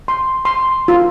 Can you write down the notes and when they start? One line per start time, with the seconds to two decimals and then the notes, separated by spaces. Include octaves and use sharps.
0.08 C6
0.45 C6
0.88 F4